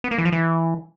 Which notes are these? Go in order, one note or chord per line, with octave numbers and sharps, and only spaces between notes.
B3
A#3
E3
F3
E3